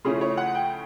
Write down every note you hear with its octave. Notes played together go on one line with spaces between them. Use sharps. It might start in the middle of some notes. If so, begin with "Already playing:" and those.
C#3 F3 A3 C#4 E4 G#4
C#5
F#5
G5